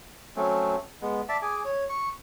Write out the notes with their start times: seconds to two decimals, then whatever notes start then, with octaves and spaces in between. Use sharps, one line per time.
0.36 F#3 A3 C4 C#4
1.02 G#3 B3
1.29 D5 E5 A5 D6
1.42 G#4 G#5 D6
1.65 C#5
1.89 C#6